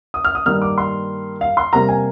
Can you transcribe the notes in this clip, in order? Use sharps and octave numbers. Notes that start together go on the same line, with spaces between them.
D#6
F6
D#6
G2 D#3 A#3 F6
D6
C6
F5
C6
C3 G3 A#3 A#5
G#5